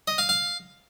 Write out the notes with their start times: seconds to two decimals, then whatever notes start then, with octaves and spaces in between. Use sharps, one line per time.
0.08 D#5
0.18 F5
0.29 F5